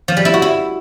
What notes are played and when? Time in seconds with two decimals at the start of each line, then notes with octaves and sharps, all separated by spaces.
0.08 F3
0.17 G3
0.25 E4
0.34 F#4
0.42 E4